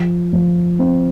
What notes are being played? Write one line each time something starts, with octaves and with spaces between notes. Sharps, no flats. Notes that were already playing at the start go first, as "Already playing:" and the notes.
Already playing: F3
F3
C4